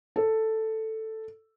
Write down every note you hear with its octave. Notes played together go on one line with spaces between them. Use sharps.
A4